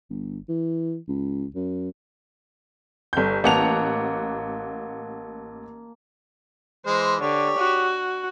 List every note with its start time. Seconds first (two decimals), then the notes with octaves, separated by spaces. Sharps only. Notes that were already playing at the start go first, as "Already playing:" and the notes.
0.10 G1
0.49 E3
1.08 C#2
1.55 F#2
3.13 G1 G6
3.44 A1 A#3 F#5 A5 F7
6.86 E3 G#3 C5
7.21 D3 G4 C#5
7.59 F#4